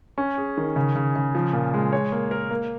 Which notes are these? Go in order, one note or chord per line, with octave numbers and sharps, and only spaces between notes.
C#4
G#4
D#3
C#3
C#3
C#3
F3
A#2
G#3
C#5
A#3
A#4
A#3